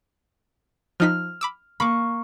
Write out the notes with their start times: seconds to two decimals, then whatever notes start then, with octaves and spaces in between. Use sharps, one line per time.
1.00 F3 D#4 F6 B6
1.41 B5 D6 E6
1.80 A#3 B5 C#6 D6